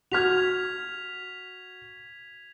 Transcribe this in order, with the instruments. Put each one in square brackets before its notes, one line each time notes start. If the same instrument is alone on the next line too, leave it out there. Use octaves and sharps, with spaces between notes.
[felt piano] F#4 F6 [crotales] G#6 B6 F7